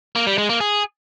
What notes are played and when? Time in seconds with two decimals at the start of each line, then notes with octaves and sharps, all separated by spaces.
0.16 A#3
0.27 G3
0.38 G#3
0.49 A#3
0.60 G#4